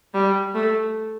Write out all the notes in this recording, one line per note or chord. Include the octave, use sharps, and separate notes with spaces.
G3
A3